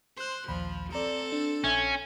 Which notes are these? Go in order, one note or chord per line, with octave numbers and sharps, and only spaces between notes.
C5 C6 F#6
A#1 D#2 F3 B5
C4 A4 D5 A#5
D4
A#1 C#4 E5